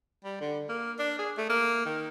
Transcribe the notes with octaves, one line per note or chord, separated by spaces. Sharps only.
G3
D3
A#3
D4
G#4
A3
A#3
D#3